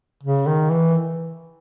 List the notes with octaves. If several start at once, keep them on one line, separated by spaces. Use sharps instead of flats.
C#3
D#3
E3